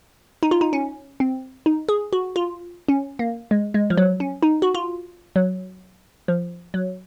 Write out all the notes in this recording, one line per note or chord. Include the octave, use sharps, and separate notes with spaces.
D#4
F4
D#4
C#4
C4
D#4
G#4
F#4
F4
C#4
A#3
G#3
G#3
F3
F#3
C#4
D#4
F#4
F4
F#3
F3
F#3